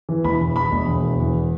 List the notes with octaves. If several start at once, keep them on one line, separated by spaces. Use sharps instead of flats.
E3
E1 B5
E2
E2 B5
E1
E2
E1
E2